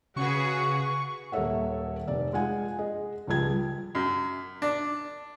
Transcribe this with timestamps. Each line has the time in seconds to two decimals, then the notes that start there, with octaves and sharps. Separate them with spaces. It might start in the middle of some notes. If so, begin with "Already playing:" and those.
0.16 C#3 F#4 G#4 B4 C#6
1.32 D#1 A#3 A4 C#5 E5 F#5
2.08 F1 D5
2.33 G#3 F4 F#5 G#5
2.79 G#4 D#5
3.28 C#2 F3 G3 G#4 G#6
3.95 F#2
4.62 D4